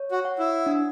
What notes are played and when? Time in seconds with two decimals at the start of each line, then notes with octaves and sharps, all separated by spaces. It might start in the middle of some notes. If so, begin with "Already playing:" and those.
Already playing: C#5
0.11 F#4
0.25 F#5
0.39 E4
0.66 D4